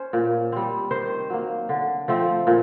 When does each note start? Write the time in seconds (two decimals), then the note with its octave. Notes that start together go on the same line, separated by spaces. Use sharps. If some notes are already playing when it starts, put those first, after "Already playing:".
Already playing: C#4 C5
0.13 A#2
0.52 G3 C4
0.91 D#3 C5
1.30 F#3 A#3
1.69 D3
2.08 F3 A3 C4
2.47 A#2